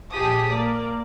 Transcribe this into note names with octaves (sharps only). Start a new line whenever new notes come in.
A#1 G4 G#4 A5 D#6 B6
A#3 D5